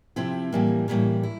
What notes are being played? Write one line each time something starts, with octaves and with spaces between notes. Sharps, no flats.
C3 F3 C4 E4
A2 E3 G3 A#3
A2 E3 G3 A#3
E4